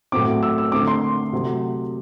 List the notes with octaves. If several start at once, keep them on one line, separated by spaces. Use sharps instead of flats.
A2 F#3 C4 D6
E6
E6
D3 A3 C4 D6
C6
C3 F#3 A3 C4